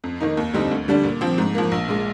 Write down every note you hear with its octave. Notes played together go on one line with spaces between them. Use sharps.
F2
D#3 A#3 D#4
D#2
D3 G3 C4 D#4
D2
D3 G3 D4
A#2
F3 C4
G#2
F3 A#3
A#1
A#2 G#3